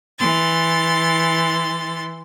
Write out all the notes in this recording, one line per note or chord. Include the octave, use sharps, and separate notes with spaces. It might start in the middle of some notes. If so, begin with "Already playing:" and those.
E3 C6 A6